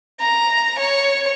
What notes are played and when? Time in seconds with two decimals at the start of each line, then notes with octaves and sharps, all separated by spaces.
0.20 A#5
0.79 C#5